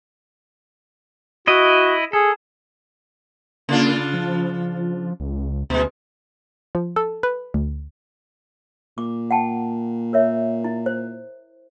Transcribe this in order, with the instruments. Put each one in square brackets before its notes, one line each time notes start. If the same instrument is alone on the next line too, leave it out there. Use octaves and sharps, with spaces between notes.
[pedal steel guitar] E4 D#5 [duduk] F#4
[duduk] G#4 [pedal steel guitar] A4
[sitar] C#3 D4 F4 [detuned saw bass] A#3
[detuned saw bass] F3
C#2
[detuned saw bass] D2 [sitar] B2 G#3
[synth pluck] F3
A4
B4
D2
[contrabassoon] A#2 [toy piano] D6
[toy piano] F#5 G5 A5
A#4 C#5 E5
E4
C5